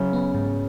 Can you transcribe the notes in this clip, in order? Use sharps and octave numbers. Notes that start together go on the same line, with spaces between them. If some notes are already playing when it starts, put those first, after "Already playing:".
Already playing: C#3 F#3 C#4
B3
G#2